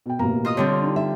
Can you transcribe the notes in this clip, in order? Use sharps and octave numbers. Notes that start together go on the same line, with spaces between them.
B2 G5
A1 B2 A#3 A#5
F4 D#5 D#6
D3 G3 C4 C#5
D4 D#4
E5